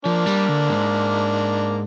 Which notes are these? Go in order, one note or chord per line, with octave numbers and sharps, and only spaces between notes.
F3 A#3 D4
G3
D3
G#2